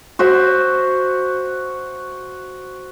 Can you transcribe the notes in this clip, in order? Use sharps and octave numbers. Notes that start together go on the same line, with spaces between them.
F#4 C5 E5